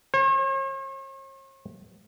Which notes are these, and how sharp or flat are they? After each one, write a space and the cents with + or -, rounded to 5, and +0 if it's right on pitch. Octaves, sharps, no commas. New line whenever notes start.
C#5 -45